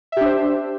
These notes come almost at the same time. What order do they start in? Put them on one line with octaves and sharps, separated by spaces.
E5 G4 D4 C5